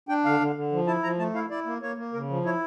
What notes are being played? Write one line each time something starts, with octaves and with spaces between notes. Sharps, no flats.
D4 G5
D3 F5
D3
D3
F3
E4 A5
F3 A#5
A3 A5
E4 F5
E4 D5
A#3
A#3 C#5
A#3
C#3 A#4
F3
E4 C#5